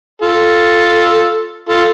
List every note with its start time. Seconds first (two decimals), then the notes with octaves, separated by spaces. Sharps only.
0.22 F4 A4
1.69 F4 A4